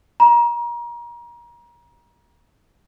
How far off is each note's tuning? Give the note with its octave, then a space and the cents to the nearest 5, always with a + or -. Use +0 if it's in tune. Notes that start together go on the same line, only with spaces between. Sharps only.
A#5 +30